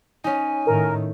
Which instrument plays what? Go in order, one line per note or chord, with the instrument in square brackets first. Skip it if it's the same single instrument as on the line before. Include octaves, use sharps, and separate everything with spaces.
[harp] C#4 D#4 [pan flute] G#5
[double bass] A2 D#3 [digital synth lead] A#4